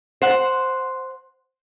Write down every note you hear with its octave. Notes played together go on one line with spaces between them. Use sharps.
C5 F#5